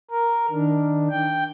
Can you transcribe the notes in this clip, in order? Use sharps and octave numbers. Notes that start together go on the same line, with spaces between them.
A#4
D#3 D4
G5